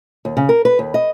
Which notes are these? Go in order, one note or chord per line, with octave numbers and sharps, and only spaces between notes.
D#2
C#3
A#4
B4
D#2
D#5